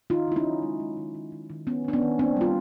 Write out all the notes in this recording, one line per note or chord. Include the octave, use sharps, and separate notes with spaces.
D#3 D#4 F4
D#3 E4
C#4 D#4
F#3
G#3
G#3
D#3
D#3
D#3
D#3
D#3 B3 C#4
D#3 D4
B3 C#4
D#3
A#3 C4 D4
G3 F4